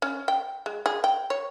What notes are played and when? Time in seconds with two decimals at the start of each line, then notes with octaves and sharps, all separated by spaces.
0.02 C#4
0.28 G5
0.66 G#3
0.86 G#4
1.04 G5
1.30 C#5